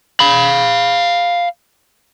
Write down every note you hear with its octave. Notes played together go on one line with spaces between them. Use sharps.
F5 B5